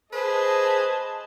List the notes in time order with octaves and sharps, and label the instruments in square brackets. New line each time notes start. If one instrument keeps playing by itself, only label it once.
[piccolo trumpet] G#4 [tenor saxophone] B4 [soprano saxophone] C5 [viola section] D#5 A5